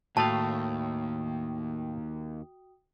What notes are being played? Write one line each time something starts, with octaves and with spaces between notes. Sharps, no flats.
D#2 A2 A3 F#4 F5 G5 A5 D#6